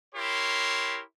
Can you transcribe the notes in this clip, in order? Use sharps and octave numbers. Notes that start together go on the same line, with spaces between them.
E4 G4 A#4 C#5 C6